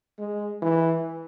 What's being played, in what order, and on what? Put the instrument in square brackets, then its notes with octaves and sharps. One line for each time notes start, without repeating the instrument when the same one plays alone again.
[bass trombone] G#3
E3